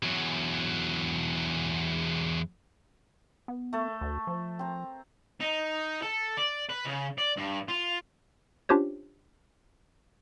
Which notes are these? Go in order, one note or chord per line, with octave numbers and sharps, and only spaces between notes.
E2 F#3
B3
A3 A4
D2
F3
C4 A#5
D#4
A4
D5
B4
C#3
D5
G2
F4
C#4 D4 F4 G4 C5 C#5